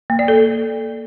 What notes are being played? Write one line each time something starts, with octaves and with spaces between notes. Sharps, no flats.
A#3
D5
A4